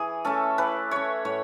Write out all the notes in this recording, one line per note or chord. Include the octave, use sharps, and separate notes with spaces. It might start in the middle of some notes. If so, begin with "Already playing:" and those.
Already playing: E3 G#4
A3 C#4 A4
E3 B4
A3 C#4 C#5
A2 C#5